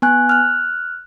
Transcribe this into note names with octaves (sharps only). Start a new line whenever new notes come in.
B3 G#5 F#6
F6 F#6